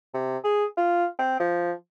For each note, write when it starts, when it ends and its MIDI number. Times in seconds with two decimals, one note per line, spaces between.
0.14 0.38 48
0.44 0.65 68
0.77 1.06 65
1.19 1.37 60
1.40 1.72 53